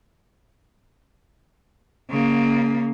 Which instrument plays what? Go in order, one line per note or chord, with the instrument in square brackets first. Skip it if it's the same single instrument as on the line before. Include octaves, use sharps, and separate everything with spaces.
[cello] C#3 A#3